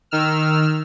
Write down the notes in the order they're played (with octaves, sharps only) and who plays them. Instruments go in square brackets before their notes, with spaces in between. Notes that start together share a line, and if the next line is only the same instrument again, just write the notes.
[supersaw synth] D#3 E6 F6